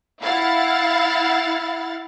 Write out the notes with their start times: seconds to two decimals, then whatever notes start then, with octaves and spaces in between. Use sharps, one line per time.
0.23 E4 F5 F#5 A6